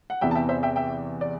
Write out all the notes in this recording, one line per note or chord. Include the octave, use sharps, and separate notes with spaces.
F#5
E2 C3 E3 B3 E5 G5
A5
E5 G5
C5 E5
E5 G5
E5 G5
D5